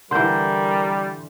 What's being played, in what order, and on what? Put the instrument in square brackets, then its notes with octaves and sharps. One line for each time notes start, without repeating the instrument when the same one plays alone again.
[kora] D3 E3 [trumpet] G3 [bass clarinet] A#4 [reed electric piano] C6 G6